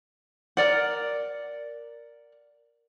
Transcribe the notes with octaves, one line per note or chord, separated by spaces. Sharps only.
A#4 D5 F#5